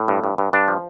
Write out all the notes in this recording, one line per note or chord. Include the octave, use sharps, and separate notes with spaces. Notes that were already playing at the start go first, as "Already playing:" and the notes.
Already playing: A2
G2
G2
G2
G2 D4
F3